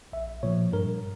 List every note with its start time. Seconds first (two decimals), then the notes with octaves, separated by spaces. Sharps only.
0.13 A#1 E5
0.43 A#2 F3 C#5
0.72 G2 A#4